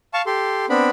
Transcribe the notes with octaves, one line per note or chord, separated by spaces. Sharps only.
F5 A5 C#6
G4 A4 C6
B3 C4 D4 B5